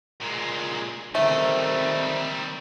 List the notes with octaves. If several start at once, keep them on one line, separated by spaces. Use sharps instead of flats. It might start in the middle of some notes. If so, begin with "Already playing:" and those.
A#2 G#3
D#3 G3 A3 C4 D#4